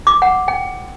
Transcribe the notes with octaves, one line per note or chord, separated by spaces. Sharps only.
D6
F#5
G5